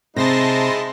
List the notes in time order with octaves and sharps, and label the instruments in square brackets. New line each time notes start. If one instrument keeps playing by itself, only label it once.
[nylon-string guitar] C3 [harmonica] G#3 D#4 E4 [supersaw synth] A5 C6 A#6